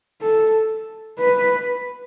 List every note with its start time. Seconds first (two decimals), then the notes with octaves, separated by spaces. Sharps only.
0.22 A4
1.19 B4